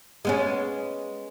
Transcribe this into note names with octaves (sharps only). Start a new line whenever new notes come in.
G#3 B3 C#4